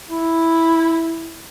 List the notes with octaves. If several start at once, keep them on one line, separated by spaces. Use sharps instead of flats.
E4